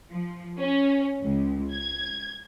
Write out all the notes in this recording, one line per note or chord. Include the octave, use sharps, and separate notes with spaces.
F3
C#4
C#2
G#6